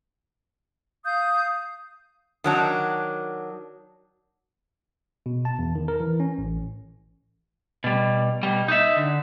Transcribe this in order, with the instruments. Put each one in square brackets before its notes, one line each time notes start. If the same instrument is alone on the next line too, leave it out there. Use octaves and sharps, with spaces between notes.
[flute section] F5 D#6 G6
[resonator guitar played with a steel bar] D#3 F#3 D4
[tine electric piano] B2
A5
E2
D#3
A#4
E3
C#4
A1
[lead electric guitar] B2 G3
B2 G3
D#4 E5
D3